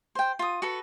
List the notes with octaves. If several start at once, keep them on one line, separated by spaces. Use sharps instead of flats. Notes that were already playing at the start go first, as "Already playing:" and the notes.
C5 G5
F4 D#6
F#4 A4 B4